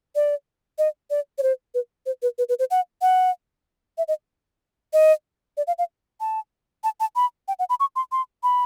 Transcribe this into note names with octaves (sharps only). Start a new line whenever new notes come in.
D5
D#5
D5
C#5
C5
B4
C5
B4
B4
B4
C5
F#5
F#5
E5
D#5
D#5
D5
F5
F5
A5
A5
A5
B5
G5
F#5
B5
C#6
C6
C6
B5